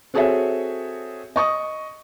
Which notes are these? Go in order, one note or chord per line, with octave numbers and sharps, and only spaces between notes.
C4 F#4 G#4 A4 C#5 E5
D#5 C#6 D#6